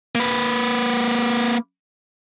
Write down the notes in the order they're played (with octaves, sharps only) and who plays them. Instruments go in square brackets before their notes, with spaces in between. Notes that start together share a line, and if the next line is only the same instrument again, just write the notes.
[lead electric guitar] A#3 B4